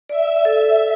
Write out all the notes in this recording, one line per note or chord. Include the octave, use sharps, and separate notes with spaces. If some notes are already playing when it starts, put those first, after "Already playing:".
D5 E5
A4